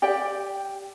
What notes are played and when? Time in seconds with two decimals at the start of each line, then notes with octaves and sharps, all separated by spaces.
0.02 G4 D5 G5